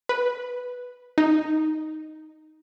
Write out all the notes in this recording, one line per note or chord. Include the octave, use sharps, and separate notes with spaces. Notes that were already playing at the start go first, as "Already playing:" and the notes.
B4
D#4